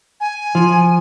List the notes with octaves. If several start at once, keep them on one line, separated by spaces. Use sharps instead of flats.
G#5
F3